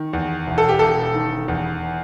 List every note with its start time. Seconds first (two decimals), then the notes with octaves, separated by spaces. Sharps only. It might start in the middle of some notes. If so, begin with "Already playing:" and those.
Already playing: D#3
0.13 E2
0.47 E1
0.58 A4
0.69 G4
0.79 E1 A4
1.14 D#3
1.48 E2